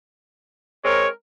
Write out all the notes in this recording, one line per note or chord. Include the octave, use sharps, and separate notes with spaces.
G#3 C4 A#4 C#5